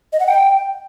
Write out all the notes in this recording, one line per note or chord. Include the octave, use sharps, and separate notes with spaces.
D#5
F#5
G5